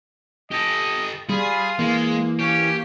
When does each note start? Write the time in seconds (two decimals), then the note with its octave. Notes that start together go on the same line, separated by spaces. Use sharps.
0.52 G4 A4 D#5
1.29 G3 F4 G#4 B5
1.79 E3 G#3 A#3
2.40 C#4 G4